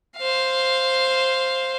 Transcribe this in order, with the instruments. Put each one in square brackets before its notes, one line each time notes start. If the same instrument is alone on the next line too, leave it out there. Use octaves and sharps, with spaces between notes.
[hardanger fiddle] C5 F5